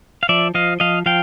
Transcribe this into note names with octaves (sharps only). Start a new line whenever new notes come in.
F5
F3 D5 E5
F3 D#5 F5
F3 D#5 F5
F3 F5 G5